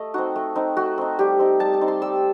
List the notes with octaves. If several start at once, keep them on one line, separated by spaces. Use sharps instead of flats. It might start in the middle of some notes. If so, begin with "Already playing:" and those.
Already playing: A3 D#5
C4 D#4 F#4
A3
C4 D#4
A3 F#4
C4 D#4
G3 G4
C4 D#4
G3 A5
A5
C4 D#4
C6
G3 E6